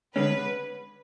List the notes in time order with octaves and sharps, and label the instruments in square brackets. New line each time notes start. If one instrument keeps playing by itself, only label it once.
[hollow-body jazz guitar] D3 G#3 C#4 [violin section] B4